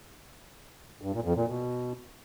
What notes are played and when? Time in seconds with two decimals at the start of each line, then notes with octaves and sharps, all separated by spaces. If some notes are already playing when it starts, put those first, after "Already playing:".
1.01 G2
1.13 A#2
1.24 F2
1.36 A#2
1.47 B2